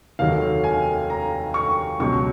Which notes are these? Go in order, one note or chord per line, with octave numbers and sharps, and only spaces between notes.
F1 D#2 D#3 F#3 F5
G#5
A#5
C#6
C#2 B2 F#3 C#6